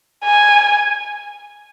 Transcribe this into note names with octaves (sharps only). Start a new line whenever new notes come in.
G#5